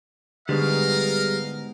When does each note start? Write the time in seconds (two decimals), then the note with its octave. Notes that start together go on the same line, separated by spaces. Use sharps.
0.49 G#2 B2 D3 G3 G#3 A#4 D#5 F5